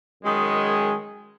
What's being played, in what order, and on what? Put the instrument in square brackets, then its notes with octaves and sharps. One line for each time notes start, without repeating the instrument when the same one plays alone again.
[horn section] F#2 D#3 G#3